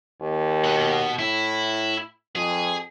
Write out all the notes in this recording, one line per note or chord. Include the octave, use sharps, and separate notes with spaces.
D#2
B2 F#5
A2 E4
F2 G#4